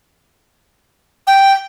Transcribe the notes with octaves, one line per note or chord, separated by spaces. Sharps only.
G5